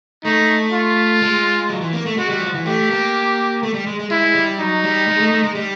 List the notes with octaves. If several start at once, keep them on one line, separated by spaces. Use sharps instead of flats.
A3 D#4
F4
G#3
F#3
E3
A#3
A3
G#3 F#4
G3
F3
E3
A3 G4
A#3
A3
G3
G#3
G#3
G#3 E4
G3
F#3 D#4
G3
G#3
A3
A3
G#3
G3